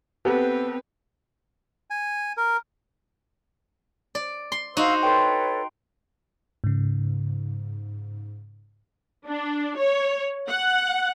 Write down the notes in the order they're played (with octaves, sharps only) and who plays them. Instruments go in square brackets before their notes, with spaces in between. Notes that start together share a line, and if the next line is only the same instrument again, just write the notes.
[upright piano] B3 G4 A4 [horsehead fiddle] C4 B4
[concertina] G#5
A#4
[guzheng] D5
C6
[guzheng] D#4 F#4 [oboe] C5 [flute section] F5 E6
[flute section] A4 B4 C#5 [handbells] G5 C6
[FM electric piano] G#2 C#3
[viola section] D4
C#5
F#5